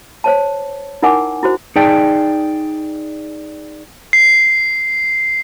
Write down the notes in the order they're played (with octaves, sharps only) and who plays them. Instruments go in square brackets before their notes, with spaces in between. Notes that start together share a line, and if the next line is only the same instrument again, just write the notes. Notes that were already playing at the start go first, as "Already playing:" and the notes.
[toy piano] C5 C#5 A5
D#4 E4 A#4 F#5 G#5 D6
E4 F#4 C5
[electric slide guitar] D#4 G#4 D5 G5 A5
[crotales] C7